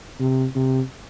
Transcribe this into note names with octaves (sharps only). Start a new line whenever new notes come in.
C3
C3